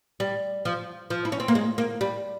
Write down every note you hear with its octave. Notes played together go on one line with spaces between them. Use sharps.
G3
F3
F3
E4
C#4
C4
A#3
G#3
A#3
G3